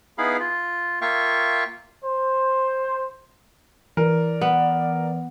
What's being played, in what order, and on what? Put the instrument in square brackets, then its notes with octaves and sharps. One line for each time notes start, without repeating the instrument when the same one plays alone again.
[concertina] B3 D#4 E4 G#4 F5 B5
F4
A#3 F4 E5 F5 G5 C#6
[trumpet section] C5
[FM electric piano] E3 [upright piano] A#4 [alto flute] D5
[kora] B3